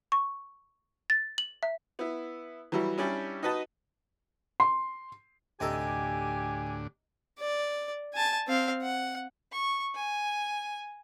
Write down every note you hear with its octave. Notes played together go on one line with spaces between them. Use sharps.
C#6
A6
F#7
E5
B3 E4
E3 F#3 G3 E4 F#4
G3 C#4 D4 E4 G4
D#4 F#4 B4 D#5 A5
C6
D2 A2 C3 D4 D#4 G4 A4 G#5
D5
G#5 A5
C4 F5
F#5
C#6
G#5